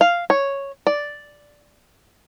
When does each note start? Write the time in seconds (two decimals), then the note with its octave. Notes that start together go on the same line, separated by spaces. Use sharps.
0.01 F5
0.30 C#5
0.87 D5